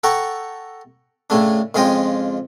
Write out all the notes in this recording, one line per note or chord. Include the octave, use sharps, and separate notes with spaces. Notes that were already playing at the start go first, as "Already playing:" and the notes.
A4 F#5 G5 A#5 C#6
A2 C#3 A3 D4
F2 C#3 G#3 F4 D#5 G5